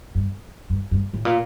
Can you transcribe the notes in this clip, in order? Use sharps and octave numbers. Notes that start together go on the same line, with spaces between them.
G2
G2
G2
A2
A#2